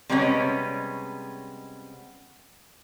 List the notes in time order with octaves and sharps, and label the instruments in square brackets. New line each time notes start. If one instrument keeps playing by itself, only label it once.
[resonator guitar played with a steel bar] C3 G3 G#3 B3 C#4 C#5